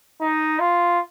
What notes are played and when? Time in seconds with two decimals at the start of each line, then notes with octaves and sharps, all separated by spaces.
0.21 D#4
0.60 F4